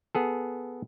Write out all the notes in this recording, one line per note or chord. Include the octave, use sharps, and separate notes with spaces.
B3 G#4 A4